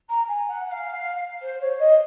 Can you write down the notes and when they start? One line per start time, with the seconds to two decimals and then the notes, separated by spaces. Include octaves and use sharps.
0.09 A#5
0.28 G#5
0.47 F#5
0.66 F#5
0.71 F5
1.41 C5
1.60 C#5
1.79 D#5